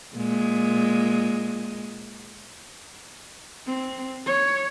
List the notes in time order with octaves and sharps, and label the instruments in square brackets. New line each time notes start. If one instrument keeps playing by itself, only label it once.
[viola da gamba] A#2 G#3
[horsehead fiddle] C4
C#5